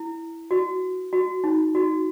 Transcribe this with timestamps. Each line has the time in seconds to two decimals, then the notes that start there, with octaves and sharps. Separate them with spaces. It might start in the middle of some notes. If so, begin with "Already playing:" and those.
Already playing: E4
0.51 F#4
1.13 F#4
1.44 D#4
1.75 F#4